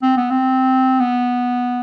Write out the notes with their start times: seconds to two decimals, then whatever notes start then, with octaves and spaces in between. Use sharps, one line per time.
0.02 C4
0.17 B3
0.31 C4
1.00 B3